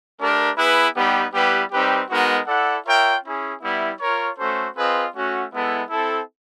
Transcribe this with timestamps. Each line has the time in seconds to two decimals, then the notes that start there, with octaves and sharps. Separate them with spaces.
0.19 A3 D4 G4 A#4
0.57 B3 E4 G#4 B4
0.95 G3 B3 D#4 G4 B4
1.33 G3 B3 E4 G4 B4
1.72 G3 C4 D#4 G4 B4
2.09 G#3 B3 D#4 F#4 A#4
2.47 E4 A4 D5 F#5
2.85 F4 A#4 C#5 E5 G5
3.23 C#4 E4 G#4
3.62 G3 B3 E4
4.00 F4 A#4 C#5
4.38 A3 C#4 F#4 A4 C5
4.76 C4 F4 G#4 B4 D#5
5.13 A3 C#4 F#4
5.52 G#3 B3 E4 A4
5.90 C4 E4 A4